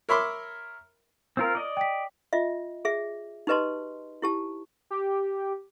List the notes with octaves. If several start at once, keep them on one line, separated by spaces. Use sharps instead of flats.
A#4 C#5 E5 B5 C6 D6
C4 F4 A#4
D5 D#5
G5 B6
F4 D#5 E5
G#4 E5
D#4 G4 B4 D#5 A5 C6
E4 G4 A5
G4